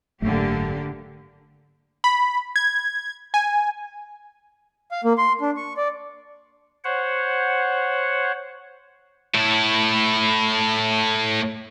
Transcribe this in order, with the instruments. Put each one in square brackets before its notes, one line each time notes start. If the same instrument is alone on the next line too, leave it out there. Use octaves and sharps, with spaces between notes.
[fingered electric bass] F#1 G#2 F#3 [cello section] D3 A#3 G4 [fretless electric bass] A3
[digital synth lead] B5
G#6
G#5
[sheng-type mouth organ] F5
A#3
C6
D4
C#6
D5
[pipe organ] C5 C#5 F#5
[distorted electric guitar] A2 E4